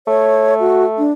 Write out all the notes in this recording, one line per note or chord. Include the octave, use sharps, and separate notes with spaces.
A3 C#5
F#4
D4